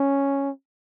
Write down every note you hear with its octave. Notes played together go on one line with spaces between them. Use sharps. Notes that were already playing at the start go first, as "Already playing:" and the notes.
Already playing: C#4